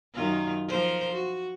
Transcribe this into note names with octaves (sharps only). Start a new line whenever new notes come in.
F#2 D#3 F4
F3 A#4 C5
F#4